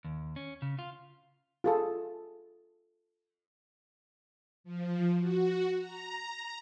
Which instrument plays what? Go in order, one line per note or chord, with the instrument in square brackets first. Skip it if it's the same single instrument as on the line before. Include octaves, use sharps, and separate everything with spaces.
[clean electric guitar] D#2
C#4
C#3
F4
[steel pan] F4 G#4 A4
[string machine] F3
F#4
A#5